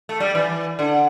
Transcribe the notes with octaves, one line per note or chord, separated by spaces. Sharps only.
A3
G3
E3
D3